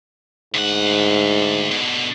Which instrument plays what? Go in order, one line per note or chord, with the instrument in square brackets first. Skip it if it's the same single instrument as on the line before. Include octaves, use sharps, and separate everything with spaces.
[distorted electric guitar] D2 F#5 [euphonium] G#2
[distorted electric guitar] B2 D3